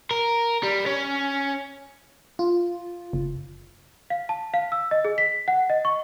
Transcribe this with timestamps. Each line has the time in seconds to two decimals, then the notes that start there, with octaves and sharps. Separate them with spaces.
0.11 A#4
0.63 G3
0.86 C#4
2.39 F4
3.13 F#1
4.10 F5
4.29 A5
4.54 F5
4.72 E6
4.91 D#5
5.05 G#4
5.18 B6
5.48 F#5
5.70 D#5
5.85 C#6